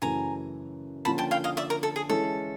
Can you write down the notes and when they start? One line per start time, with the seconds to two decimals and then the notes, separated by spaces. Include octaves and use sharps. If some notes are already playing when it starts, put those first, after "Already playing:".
0.02 F#2 C#3 E3 A3 G#5 A#5
1.05 D3 F3 A#3 C#4 F4 A5 B5
1.18 G5 A5
1.31 F5 G5
1.44 D#5 F5
1.57 D5 E5
1.70 A#4
1.83 A4
1.96 G#4
2.09 E3 G#3 C#4 E4 A4